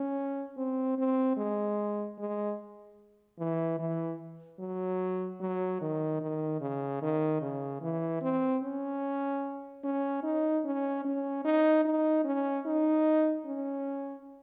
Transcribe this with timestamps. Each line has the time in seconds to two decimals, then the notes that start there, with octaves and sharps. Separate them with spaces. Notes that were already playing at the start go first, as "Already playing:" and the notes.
Already playing: C#4
0.57 C4
0.98 C4
1.37 G#3
2.19 G#3
3.39 E3
3.79 E3
4.59 F#3
5.40 F#3
5.81 D#3
6.21 D#3
6.61 C#3
7.02 D#3
7.42 C#3
7.82 E3
8.22 C4
8.63 C#4
9.84 C#4
10.23 D#4
10.65 C#4
11.05 C#4
11.45 D#4
11.85 D#4
12.25 C#4
12.66 D#4
13.46 C#4